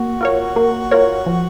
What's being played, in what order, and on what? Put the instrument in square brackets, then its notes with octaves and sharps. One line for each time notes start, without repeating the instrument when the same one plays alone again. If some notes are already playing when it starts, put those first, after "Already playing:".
Already playing: [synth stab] A#3 [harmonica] F#4
[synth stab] F4 A#4 C#5
A#3
F4 A#4 C#5
F3